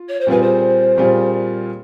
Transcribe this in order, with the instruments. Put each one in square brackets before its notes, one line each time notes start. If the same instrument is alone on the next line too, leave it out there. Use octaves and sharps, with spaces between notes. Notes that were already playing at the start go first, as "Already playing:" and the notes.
Already playing: [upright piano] F4
[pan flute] C#5
C5
[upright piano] A#2 G3 C4 F4 G#4 [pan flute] B4
[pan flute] C5
[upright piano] A#2 G3 C4 F4 G#4